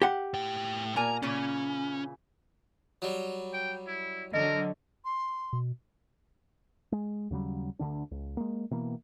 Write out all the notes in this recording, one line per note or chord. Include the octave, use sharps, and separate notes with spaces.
G4 F#5
A2 G5
A#2 A#4 G#5 A#5
A#2 C#3 E3 C#4
F#3 G3
G5
E4
D3 F#3 A#4 D#5
C6
B2
G#3
D#2 C#3 F#3 G3
D2 D3 D4
C#2
G#3 A#3
B2 E3 A#3